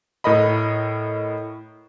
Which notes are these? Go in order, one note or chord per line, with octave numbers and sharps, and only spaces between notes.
A2 A#4 D#5 B5